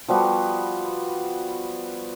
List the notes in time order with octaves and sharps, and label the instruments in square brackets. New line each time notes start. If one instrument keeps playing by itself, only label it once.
[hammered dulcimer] F3 G3 B3 F#4